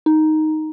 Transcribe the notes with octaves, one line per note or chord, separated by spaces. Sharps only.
D#4